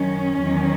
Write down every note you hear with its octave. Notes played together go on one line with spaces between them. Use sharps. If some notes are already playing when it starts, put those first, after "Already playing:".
Already playing: F#2 D#3 F#3 C#4
E2 D#3 F#3